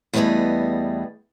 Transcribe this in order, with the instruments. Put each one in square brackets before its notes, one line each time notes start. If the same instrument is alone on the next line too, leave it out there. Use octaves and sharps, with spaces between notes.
[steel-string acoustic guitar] E2 G3 A3 B3 G#4 D#5